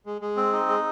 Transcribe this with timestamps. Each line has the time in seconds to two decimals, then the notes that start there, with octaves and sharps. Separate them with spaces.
0.06 G#3
0.22 G#3
0.37 C4
0.53 D#4
0.69 G#3